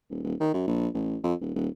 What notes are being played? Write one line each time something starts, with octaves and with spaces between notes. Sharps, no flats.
D#1
D#1
D#3
F#2
A#1
A1
F2
D#1
D#1